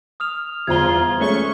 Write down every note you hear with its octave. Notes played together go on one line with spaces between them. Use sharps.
D#6 F6 F7
G1 E2 F4 C5 A#5 G#6 G7
G#3 A3 C#4 C#6